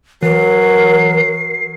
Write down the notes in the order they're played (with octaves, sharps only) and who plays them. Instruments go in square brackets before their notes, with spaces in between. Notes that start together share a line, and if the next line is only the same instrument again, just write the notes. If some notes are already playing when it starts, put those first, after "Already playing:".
[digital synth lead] E3 [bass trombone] F#3 [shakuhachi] A#4 [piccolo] C7